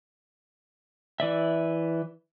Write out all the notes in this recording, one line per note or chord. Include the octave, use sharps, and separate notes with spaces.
E3 D5 E5